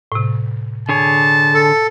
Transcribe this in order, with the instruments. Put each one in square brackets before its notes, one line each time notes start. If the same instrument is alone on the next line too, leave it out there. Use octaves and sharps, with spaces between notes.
[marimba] A2 C3
[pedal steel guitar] D3 G#4 C#5 [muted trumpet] A5
[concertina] A4